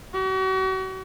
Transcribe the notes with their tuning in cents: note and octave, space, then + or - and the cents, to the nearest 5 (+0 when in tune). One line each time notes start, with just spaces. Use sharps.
F#4 +40